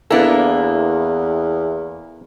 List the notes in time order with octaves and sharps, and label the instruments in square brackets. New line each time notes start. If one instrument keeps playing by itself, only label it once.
[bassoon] E2 [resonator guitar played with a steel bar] A#3 D4 [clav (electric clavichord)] B3 E4 A4